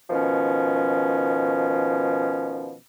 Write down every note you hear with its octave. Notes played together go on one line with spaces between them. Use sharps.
B2 D#3 F3 C#4